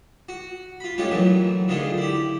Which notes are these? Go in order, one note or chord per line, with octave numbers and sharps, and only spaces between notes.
F#4
F4 B5
G#3 A3 C#4 D#4 F4 G4
A#2 E3 F#3 A3
D3 D#3 G#3 A3 F4 G#4
E4 G4